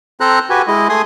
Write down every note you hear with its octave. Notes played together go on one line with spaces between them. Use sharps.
C4 A4 C5 A#5 F#6
F#4 G4 B4 G#5
G#3 E4 D#5
A3 G#5 C6 D#6